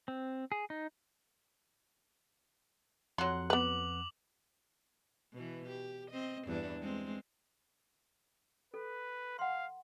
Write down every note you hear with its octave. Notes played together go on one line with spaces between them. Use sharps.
C4
G#4
D#4
F2 F#3 F#5 C6 F#6
B3 B4 D6 F7 F#7
B2 E3
G4
C4 D#5
E2 G2 D4
G#3 C4
A4 B4
F5 F#5 C6